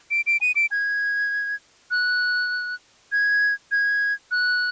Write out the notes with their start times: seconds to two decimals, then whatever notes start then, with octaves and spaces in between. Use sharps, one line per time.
0.11 D7
0.27 D7
0.41 D#7
0.56 D7
0.71 G#6
1.91 F#6
3.12 G#6
3.72 G#6
4.31 F#6